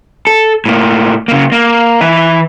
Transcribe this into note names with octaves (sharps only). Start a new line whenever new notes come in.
A4
A2 A#3
C#3 A#3
A#3
E3 E5